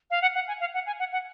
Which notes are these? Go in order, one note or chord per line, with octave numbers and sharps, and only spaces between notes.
F5
F#5
F#5
G#5
F5
F#5
G#5
F#5
F#5